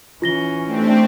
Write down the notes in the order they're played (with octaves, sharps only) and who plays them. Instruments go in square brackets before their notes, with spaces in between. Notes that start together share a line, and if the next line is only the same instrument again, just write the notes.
[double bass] E3 C#4 [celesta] F4 A#6 G7
[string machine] A3 D4 G4 [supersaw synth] C4